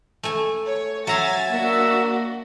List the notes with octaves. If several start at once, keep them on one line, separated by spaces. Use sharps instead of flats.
A3 G#5
C#5
F#3 E5 G#5 A#5 C6 A6
A#3 D4 F#4